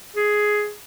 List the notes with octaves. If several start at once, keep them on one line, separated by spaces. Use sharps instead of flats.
G#4